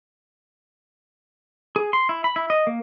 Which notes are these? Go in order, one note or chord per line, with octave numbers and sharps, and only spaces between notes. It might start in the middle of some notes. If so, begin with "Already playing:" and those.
G#4
C6
E4
B5
E4
D#5
A#3